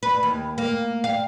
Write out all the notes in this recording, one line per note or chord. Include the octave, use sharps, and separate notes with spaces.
B4
D#2
A#3
F5